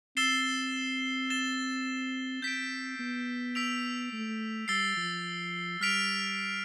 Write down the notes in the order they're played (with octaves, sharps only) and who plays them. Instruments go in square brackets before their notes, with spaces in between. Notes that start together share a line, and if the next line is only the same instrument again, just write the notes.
[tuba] C4 [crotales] E6 A6 C7 E7 G7
[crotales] A6 E7 G7
[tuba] C4 [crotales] G6 B6 D7
[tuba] B3
[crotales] E6 B6 D7 F7
[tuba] A3
[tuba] G3 [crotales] E6 A6 C7 G7
[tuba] F3
[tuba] G3 [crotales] F6 B6 D7 F7